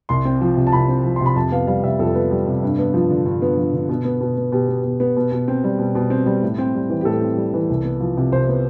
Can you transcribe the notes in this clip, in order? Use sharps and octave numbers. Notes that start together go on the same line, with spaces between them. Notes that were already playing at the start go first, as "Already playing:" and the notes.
C2 C6
C4
F3
C3
A5
C2 B5
C4
F3
C3 C6
B5
F2 A5
B3 F5
G3 F5
C3 E5
F2 A4
B3
G3
C3
G2
B3
F3
D3
G2
B3
F3
D3
B2
B3
B2
B3
B2 G4
B3
B2
B3
B2
B2
C4
G3
B2
B2
C4
G3
A2
C4
G3
E3
G4
A2 A4
C4
G3
E3
C2
B3
F3
C3
C2 C5
B3